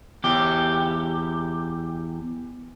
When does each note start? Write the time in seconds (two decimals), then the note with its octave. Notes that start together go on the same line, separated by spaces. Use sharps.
0.24 E2 G4